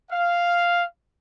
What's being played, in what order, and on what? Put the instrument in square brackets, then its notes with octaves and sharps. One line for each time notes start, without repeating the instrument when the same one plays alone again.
[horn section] F5